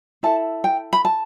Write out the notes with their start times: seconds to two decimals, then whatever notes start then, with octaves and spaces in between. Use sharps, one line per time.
0.23 E4 A4 A5
0.64 G5
0.93 B5
1.05 A5